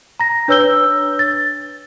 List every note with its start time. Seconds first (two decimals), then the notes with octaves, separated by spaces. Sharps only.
0.20 A#5 A#6
0.48 D4 B4 C#5 E6 G6 G7
1.19 A6